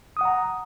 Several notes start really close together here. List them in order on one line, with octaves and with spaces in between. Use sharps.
D#6 F#5 A#5